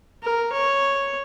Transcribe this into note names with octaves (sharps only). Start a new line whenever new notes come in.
A#4
C#5